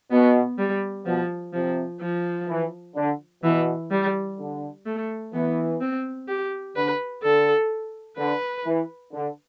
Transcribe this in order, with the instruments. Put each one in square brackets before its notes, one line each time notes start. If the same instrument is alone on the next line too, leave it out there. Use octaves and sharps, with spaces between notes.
[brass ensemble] B2 [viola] B3
[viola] G3
[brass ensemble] B2 [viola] F3
[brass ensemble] C3 [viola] F3
[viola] F3
[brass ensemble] E3
D3
[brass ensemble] B2 [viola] E3
[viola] G3
[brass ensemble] D3
[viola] A3
[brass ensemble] E3 [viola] B3
[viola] C4
G4
[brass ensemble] D3 [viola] B4
[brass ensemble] D3 [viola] A4
[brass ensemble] D3 [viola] B4
[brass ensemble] E3
D3